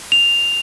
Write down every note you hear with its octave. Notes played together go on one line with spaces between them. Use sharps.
F7